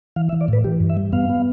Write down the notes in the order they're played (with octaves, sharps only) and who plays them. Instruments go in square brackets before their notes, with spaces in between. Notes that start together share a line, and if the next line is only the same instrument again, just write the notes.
[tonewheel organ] E3 F5
E5
E3
D5
A2 B4
E3 G4
G2
E5
G3
B3 F5
B3